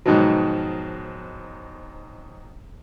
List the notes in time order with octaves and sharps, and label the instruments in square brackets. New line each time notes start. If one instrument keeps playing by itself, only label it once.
[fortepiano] G#2 B2 D#3 F3 F#3